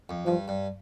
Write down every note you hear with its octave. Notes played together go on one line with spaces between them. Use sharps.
F2
G2 F3
G2